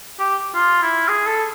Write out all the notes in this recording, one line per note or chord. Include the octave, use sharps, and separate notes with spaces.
G4
F4
E4
G#4
A4